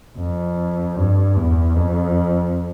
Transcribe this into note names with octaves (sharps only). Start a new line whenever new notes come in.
F2
G2
E2
F2